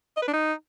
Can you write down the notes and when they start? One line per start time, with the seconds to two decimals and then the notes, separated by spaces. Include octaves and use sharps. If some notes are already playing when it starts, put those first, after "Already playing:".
0.17 D#5
0.22 B4
0.28 D4
0.33 D#4